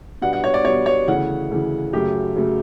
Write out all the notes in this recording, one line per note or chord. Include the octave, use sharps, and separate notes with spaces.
B2 G3 B3 D4 F#5
F#5
C#5
D5
B2 G3 B3 D4 C#5
C#5
D2 C#3 E3 F#5
D2 C#3 E3
F#2 C#3 F#3 A3 G4
F#2 C#3 F#3 A3